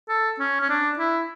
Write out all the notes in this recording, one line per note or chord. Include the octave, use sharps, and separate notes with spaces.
A4
C#4
C#4
D4
E4